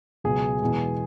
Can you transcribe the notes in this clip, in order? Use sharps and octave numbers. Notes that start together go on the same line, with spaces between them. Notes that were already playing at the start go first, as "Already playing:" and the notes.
C#2 B2 F#3 G#4
E2 B2 G#3